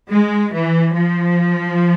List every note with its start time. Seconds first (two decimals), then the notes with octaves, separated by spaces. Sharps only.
0.10 G#3
0.52 E3
0.94 F3